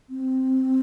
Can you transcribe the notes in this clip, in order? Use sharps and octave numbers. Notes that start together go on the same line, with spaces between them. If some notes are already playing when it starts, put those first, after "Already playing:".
C4